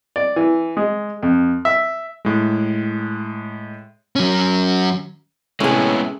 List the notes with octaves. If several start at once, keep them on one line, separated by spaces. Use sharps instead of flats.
D5
E3
G#3
F2
E5
A2 G#3
F#3 C#4
A2 C3 G#3 B3 C#4 G#4